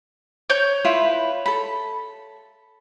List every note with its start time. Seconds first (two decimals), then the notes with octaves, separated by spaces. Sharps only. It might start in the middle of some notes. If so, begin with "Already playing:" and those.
0.50 C#5 G6
0.85 E4 F4 B4
1.46 A4 B5